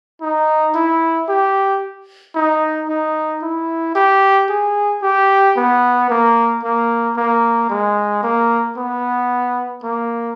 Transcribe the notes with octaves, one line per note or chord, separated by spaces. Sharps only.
D#4
E4
G4
D#4
D#4
E4
G4
G#4
G4
B3
A#3
A#3
A#3
G#3
A#3
B3
A#3